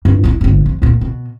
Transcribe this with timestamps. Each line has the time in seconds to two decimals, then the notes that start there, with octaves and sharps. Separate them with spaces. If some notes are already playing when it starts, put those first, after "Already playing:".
0.05 G2
0.24 D4 E4
0.41 G1 G#2
0.66 F2
0.82 E2 A#2
1.01 B2